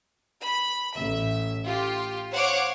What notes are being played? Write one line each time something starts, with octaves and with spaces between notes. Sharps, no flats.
B5
A1 E5
F4 G4
C5 C#5 F5 F#5 D6